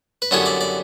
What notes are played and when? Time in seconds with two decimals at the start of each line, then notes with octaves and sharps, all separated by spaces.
0.22 B4
0.31 F#2 D3 G3 B3 E4 C#5
0.46 D5
0.61 D5